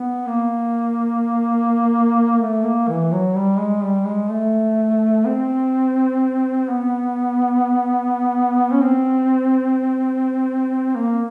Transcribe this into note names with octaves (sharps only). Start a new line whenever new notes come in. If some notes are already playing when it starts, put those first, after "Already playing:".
Already playing: B3
A#3
A3
A#3
E3
F#3
G3
G#3
G3
G#3
A3
C4
B3
C#4
C4
A#3